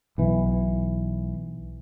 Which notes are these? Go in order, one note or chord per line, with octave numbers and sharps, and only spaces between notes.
B1 E3